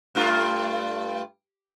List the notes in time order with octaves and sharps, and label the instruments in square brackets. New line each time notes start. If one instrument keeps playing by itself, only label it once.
[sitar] G2 A3 F4